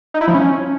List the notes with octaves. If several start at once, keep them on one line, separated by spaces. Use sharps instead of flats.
D#4
E4
F3
C#4